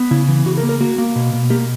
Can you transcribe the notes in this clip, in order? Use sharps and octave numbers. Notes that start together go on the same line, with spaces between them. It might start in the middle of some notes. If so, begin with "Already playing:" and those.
Already playing: B3
C#3 E4
E3
C#3 F#4
A#4
A#3
A#4
A#3 F#4
A#3
B2
B2
A#3 G4